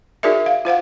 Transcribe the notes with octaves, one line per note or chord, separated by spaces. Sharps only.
D#4 F#4 G#4 A#4 D5 E5
F5
F4 C5 F5 F#5